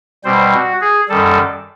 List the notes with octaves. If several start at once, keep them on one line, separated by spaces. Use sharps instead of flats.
B2 G3 C4 C5
F#4
G#4
F#2 D#3 G3 A4